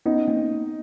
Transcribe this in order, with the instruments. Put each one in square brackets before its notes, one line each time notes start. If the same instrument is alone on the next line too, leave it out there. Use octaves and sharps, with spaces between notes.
[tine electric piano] B3 C#4 [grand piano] D#4
[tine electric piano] A#3 C4